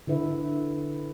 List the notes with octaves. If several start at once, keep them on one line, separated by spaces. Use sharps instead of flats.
D3 E4 B4 E5